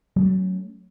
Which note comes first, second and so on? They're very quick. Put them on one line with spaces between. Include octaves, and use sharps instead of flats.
F#3 C#4 A3